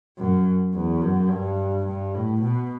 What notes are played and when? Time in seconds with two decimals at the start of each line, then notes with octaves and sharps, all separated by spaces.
0.18 F#2
0.74 E2
1.02 F#2
1.30 G2
1.86 G2
2.15 A2
2.42 B2